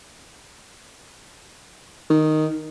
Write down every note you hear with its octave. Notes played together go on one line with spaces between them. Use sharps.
D#3